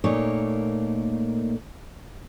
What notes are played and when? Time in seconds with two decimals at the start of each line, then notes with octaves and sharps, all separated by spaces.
0.04 A#2 A3 A#3 D#4 C#5